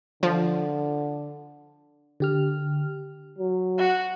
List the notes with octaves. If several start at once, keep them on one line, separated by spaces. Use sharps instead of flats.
D3 F3
D3 G4 F6
F#3
F#4 F#5